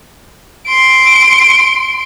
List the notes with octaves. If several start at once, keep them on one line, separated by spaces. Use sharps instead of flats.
C6 D7